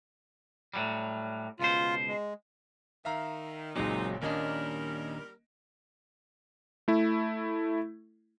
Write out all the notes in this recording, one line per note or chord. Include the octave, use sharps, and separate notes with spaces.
A2 F#3 G3
C#2 B2 F4 C5
G#3
D#3 E5 F5 A#5
F#1 A#2 F#3 G#3 C4 D#4
D#2 A#2 G3 A#3 C#4 D4 A#4 D#5
A3 E4